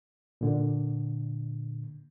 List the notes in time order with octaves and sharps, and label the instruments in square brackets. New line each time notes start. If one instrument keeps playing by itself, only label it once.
[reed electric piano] A#2 D3